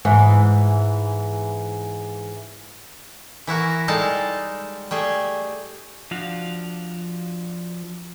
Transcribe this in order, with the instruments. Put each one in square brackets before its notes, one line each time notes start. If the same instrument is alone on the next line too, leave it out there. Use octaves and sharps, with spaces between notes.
[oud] G#2 E3
[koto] E3 E4 F#4 A#4
G3 G#3 D#4 A4 F5 A5
G3 A3 G#4
[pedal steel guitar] F3 D4 F#4 F5